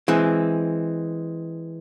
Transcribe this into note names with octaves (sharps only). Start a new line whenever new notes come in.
E3 G#3 C4